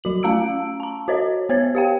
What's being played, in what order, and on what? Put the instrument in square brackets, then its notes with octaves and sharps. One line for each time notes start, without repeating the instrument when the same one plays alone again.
[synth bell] F#3 F#4 F#7
A3 C#4 F5 A#5 E6 D7
A5 A#5
F#4 C5 C#5 D#5
B3 C5 C#5 G#6 A6
G4 F5 G5